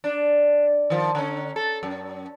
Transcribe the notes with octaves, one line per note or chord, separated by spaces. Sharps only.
D4
D#3 F3
D3 C#4
A4
F#2